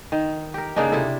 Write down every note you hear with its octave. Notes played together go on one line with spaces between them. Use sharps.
D#3
G4 A#4
C#3 A#3 D4 D#4
C3 E4 A4